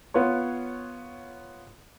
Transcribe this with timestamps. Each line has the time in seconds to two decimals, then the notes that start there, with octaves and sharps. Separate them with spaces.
0.14 B3 F4 B4 C#5